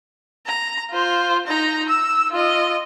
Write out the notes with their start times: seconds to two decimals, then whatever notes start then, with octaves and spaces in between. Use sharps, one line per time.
0.47 A#5
0.90 F4 C5
1.47 D#4 A#5
1.89 E6
2.31 F4 D#5